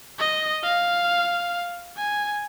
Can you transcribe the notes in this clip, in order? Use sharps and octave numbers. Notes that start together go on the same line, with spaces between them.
D#5
F5
G#5